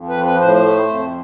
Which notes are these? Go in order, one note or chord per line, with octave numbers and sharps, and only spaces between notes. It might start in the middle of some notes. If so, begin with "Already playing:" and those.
Already playing: F2
B4
F3
B4
A2 C5
A3
F2